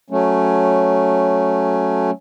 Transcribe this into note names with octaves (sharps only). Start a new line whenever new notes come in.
F#3 A3 C#4